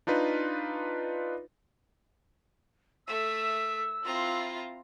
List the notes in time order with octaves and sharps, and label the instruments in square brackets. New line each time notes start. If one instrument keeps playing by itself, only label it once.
[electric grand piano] D4 D#4 F4 B4
[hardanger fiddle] A3 E5 [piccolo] E6
[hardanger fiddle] C4 A#5 [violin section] E4 F4